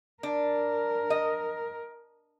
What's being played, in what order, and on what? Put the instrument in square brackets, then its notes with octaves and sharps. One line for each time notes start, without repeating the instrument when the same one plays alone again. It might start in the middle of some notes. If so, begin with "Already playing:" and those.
[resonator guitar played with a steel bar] D4 [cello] A#4
[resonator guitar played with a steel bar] D#5